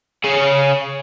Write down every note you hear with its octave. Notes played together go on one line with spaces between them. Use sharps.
C#3 G#4